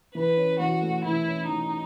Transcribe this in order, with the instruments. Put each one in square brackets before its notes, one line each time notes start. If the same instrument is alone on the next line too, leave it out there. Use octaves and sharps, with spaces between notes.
[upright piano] E3 [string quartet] B4
[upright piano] C#4
[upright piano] E3 [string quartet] F#4
[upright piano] A3
[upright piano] E3 [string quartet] E4
[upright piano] C#4
[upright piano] E3 [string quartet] D#4